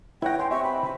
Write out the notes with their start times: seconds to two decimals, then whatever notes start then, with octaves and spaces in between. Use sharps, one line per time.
0.22 E4 B4 C#5 F#5 G5 A#6
0.39 G5 G#5 C6
0.51 C4 G4 E5 C#6
0.64 B5